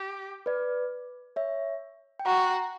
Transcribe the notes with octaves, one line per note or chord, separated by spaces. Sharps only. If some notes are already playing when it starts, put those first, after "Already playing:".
Already playing: G4
B4 D5
C#5 E5
G5
F#4 F#5 A#5